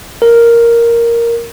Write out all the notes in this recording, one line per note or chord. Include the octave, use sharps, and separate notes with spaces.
A#4